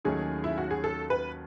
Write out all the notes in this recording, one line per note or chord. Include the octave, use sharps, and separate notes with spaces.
D#2 D#3 F#3 A3 C#4 G#4
E4
F#4
G#4
A4
B4